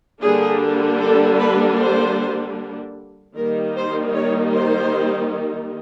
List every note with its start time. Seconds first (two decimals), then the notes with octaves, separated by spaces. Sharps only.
0.21 D3 G3 A#3 D4 G#4
1.01 A4
1.39 B4
1.79 C5
3.36 D#3 G3 A#3 D#4 A#4
3.76 C5
4.15 C#5
4.55 C5